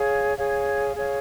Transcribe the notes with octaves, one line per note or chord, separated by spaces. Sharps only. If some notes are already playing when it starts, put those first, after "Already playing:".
Already playing: G#4 C#5 F5
G#4 C#5 F5
G#4 C#5 F5